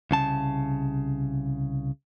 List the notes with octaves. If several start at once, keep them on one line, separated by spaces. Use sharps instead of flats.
C2 C#3 A5